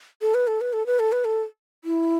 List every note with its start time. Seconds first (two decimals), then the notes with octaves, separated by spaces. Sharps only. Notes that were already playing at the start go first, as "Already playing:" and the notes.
0.22 A4
0.34 B4
0.47 A4
0.61 B4
0.73 A4
0.86 B4
0.99 A4
1.12 B4
1.25 A4
1.84 E4